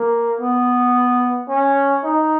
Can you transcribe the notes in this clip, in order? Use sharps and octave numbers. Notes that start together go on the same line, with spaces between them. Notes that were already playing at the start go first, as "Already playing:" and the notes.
Already playing: A#3
B3
C#4
D#4